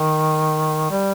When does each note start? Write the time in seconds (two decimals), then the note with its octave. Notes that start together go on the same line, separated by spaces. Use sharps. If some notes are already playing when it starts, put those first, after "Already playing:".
Already playing: D#3
0.91 G3